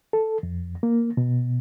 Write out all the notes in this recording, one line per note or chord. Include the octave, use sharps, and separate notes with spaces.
A4
F2
A#3
B2